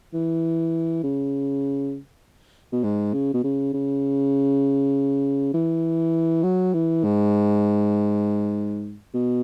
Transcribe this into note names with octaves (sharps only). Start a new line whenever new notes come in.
E3
C#3
B2
G#2
C#3
B2
C#3
C#3
E3
F#3
E3
G#2
B2